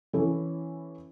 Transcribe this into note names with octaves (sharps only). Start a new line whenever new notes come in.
E3 C#4 E4 A4